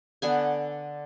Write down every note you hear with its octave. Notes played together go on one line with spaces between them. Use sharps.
D3 B3 G#5